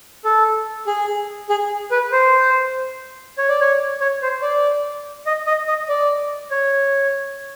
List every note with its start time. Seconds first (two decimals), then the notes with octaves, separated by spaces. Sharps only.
0.25 A4
0.87 G#4
1.50 G#4
1.91 B4
2.12 C5
3.38 C#5
3.49 D5
3.61 C#5
4.01 C#5
4.22 C5
4.42 D5
5.26 D#5
5.47 D#5
5.68 D#5
5.89 D5
6.51 C#5